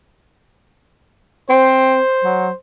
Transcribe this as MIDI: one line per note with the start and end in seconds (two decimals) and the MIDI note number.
1.50 1.99 60
1.50 2.56 72
2.24 2.49 54